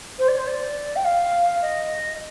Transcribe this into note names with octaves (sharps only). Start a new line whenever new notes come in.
C5
D5
C5
D5
G5
F5
D#5